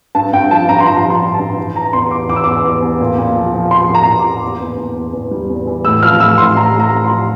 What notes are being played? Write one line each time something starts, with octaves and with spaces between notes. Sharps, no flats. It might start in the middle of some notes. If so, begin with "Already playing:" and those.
G2 A5
G2 G5
F3 A5
G2 A#5
C6
F3 A#5
F3
C6
F3
A5
G2
E3
E3 A#5
E2 C6
E3 D6
E2 D6
E6
E2 D6
E2
E2
A#2
A#2
F3
F3
F3 C6
A#2 A#5
A#2
D6
A#2
E2
E2
E2
E2
E2
G3
E2
E3
A2 E6
F3 F6
A2 E6
A2 C6
A2 A#5
A2
A#5
A2
F3 C6